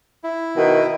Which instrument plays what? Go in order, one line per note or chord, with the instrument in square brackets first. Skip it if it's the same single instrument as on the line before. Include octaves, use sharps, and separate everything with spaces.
[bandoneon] E4
[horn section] B2 D#3